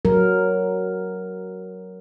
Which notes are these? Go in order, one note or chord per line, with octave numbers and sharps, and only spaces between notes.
F#3 A#4